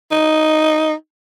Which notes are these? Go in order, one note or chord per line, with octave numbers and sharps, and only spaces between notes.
D#4